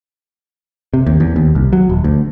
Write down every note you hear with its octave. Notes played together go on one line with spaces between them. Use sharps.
C3
D#2
E2
D#2
C2
F#3
D#1
D2